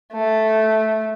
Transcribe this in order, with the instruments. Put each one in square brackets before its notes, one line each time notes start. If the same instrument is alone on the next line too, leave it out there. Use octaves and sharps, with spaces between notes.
[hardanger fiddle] A3